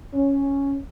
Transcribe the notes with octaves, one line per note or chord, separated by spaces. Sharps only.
C#4